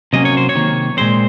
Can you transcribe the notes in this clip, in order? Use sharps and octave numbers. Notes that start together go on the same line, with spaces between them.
C3 F#3 A#3 C#4 D#5
C#5
C5
C#5
C3 D#3 A#3
A#2 G#3 C4 C5